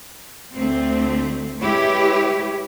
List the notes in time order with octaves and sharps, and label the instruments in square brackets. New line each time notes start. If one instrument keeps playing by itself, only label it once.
[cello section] D2 A3 C4
G#3 E4 G4 B4 C#5